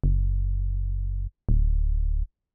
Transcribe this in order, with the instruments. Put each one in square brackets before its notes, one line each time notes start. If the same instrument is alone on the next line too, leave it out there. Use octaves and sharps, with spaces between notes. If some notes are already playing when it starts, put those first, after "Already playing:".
[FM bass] F#1
D1